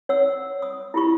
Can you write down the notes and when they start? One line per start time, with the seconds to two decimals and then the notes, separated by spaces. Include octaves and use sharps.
0.09 C#5 F#5 E6
0.62 D#6
0.94 E4 F4 G4 B5 C#6